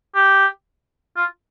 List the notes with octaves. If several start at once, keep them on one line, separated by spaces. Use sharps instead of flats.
G4
F4